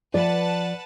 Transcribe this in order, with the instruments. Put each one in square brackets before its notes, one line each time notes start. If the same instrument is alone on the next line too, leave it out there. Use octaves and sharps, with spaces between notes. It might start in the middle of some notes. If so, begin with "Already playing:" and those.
[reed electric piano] F3 [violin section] B4 F#5 A5 [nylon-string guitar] D5